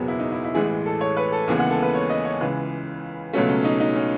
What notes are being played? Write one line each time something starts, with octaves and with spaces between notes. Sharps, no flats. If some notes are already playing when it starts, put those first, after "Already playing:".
Already playing: F#1 E2 B2 F#3 B3 G#4
E4
D#4
E4
E4
A1 A2 E3 G#3 G#4
A4
C#5
B4
A4
D#2 C#3 E3 G#3 B3 G#4
F#5
A4
B4
C#5
D#5
C#5
C#2 C#3 E3 G#3 B4
C#2 B2 F#3 A3 C#4
C#4
D#4
D#4
C#4